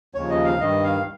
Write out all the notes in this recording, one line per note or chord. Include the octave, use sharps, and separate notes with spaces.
D#2 C#3 F3 C#5
D#5
F5
G2 D#3 D#5
F5